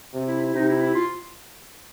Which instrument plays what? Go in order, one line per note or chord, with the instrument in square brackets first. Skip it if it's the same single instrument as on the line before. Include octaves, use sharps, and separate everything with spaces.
[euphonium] C3
[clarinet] E4
E4
[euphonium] C3 [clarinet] D#4
[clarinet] E4
E4
F4